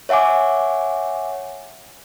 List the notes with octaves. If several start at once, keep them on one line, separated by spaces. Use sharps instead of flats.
C#5 E5 F#5 G#5 D6